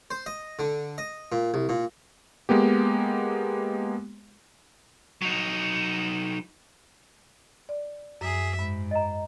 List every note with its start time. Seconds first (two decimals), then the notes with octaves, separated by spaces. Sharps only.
0.11 C5
0.26 D#5
0.59 D3
0.98 D#5
1.32 A#2
1.54 C2
1.69 A#2
2.49 G#3 A#3 B3 G4
5.22 F#3 D#4
7.69 D5
8.21 F#2 G#4 E5
8.59 G#2 B5
8.91 D#5 A#5